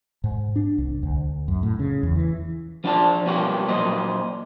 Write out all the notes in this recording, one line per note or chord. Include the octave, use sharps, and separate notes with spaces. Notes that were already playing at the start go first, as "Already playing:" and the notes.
G#2
D4
C2
D2
F#2
A2
C#3
E2
E3
F3 D4 F4 D5 A5
B2 F3 G3 A#3 B3 C#5
A#2 F#3 C5 D#5